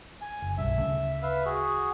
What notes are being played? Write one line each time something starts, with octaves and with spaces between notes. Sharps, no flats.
G#5
F#1
B1 G2 E5
D2 C#3 A3
B4 E5 F5
F#4 G#4